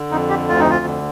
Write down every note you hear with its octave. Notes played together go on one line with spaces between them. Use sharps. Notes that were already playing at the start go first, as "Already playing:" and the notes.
Already playing: D3
F2 D#4
G4
D2 F4
D#4
F4
D3